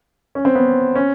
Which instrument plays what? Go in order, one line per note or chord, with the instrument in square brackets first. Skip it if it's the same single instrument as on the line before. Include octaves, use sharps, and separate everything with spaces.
[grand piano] C#4
C4
B3
C#4